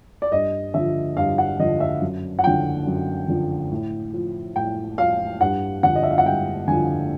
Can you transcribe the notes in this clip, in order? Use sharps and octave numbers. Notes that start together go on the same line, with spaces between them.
D5
G2 D#5
D3 F3 E5
G2 F5
F#5
D3 F3 D#5
E5
F#2
F#5
D3 F3 G5
F#2
D3 F3
A2
F3
A2 G5
F3 F5
G2 F#5
D3 F3 F#5
D#5
E5
F5
F#5
G2 G5
D3 F3 G#5